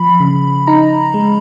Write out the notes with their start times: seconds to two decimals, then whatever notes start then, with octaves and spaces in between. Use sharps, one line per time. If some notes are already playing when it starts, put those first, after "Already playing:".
Already playing: F3 B5
0.20 C#3
0.67 D#4 A#5
1.14 G#3